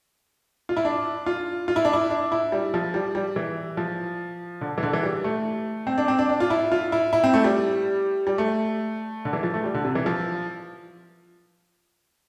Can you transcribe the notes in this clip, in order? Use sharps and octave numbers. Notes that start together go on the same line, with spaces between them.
F4
E4
D4
F4
F4
E4
D4
E4
D4
E4
G3
F3
G3
G3
E3
F3
D3
E3
D3
E3
G3
A3
C4
D4
C4
D4
D4
F4
E4
F4
E4
E4
C4
A3
G3
G3
A3
D3
E3
F3
A3
G3
D3
C3
E3
F3